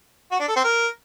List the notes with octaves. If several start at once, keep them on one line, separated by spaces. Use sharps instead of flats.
F#4
D4
A4
C4
A#4